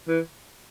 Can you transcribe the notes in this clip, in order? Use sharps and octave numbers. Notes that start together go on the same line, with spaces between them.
E3